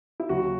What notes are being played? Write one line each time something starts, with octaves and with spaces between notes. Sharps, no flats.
E4
D#2 C#3 F#3 F#4